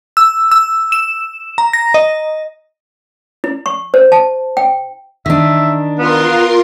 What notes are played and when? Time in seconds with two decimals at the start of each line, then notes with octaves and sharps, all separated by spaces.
0.17 E6
0.51 E6
0.92 E7
1.58 A#5
1.73 A#6
1.94 D#5
3.44 E4
3.66 C#6
3.94 C5
4.12 A5
4.57 G5
5.26 D#3 D4 E5
5.99 B3 F4 A#4 C6